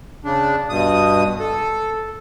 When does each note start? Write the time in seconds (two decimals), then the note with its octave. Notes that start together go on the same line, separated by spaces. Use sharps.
0.25 C#3 D4
0.69 G2 B2 D#6
1.40 A4